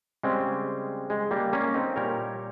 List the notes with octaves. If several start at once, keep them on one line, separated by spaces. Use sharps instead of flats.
C#3 G3 G#3 C4
G#3
G3 A#3
A#3 C#4
C4 D#4
A#2 G3 A#4 C#5